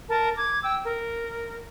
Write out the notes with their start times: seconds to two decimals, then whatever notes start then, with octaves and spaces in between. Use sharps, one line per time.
0.09 A#4 A5
0.36 D6 G#6
0.63 G5 E6
0.84 A#4